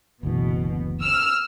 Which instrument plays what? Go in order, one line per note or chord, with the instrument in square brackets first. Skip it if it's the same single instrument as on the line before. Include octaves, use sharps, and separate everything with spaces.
[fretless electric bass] F#1 D2 E3 [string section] B2
[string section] E6 F6